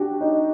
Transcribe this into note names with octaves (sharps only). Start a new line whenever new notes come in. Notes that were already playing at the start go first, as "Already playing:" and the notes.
Already playing: D4 F#4 G4
D#4